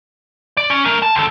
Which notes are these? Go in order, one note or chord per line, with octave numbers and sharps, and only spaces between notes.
D5
C#4
A3 A#4
A5
D2 A4